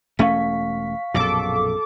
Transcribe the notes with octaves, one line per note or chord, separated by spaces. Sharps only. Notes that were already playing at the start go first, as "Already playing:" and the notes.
E1 A3 C#4 F5 C#6 B6
A#1 F#2 B2 A4 D6